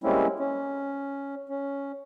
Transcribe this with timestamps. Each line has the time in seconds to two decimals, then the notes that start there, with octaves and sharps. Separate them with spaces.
0.04 G3 G#3 A#3 C4 C#4 E4
0.39 C#4
1.49 C#4